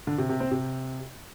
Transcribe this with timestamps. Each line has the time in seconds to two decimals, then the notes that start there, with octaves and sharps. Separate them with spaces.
0.07 D3
0.18 C3
0.29 C3
0.40 C4
0.51 C3